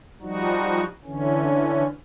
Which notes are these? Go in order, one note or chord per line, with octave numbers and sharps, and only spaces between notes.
F3 G3 D#4 F#4
D3 E3 C#4